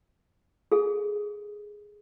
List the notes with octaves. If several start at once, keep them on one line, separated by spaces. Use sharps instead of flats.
G#4 A4